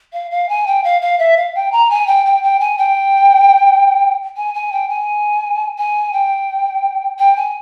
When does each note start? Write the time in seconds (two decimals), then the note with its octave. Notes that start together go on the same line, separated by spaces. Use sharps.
0.13 F5
0.31 F5
0.49 G#5
0.67 G5
0.84 F5
1.01 F5
1.19 E5
1.37 F5
1.55 G5
1.72 A#5
1.90 G#5
2.07 G5
2.25 G5
2.43 G5
2.60 G#5
2.78 G5
4.36 G#5
4.54 G#5
4.72 G5
4.89 G#5
5.78 G#5
6.13 G5
7.19 G5
7.36 G#5